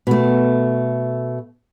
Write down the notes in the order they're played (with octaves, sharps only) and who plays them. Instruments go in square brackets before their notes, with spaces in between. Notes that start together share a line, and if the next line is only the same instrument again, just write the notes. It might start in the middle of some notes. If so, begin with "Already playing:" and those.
[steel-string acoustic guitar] B2 A3